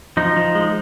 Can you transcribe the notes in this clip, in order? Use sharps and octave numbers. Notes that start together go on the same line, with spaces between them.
F3 D#4
F3
G#3